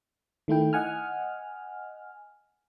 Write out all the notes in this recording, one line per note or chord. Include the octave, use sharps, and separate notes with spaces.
D#3 A3 E4 G5
D#5 F#5 G#5 F6